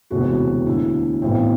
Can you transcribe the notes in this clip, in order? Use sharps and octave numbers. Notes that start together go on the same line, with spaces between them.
E1 D2 C3 E3 F#4
D2 D3 E4
B1 A2 E3 C4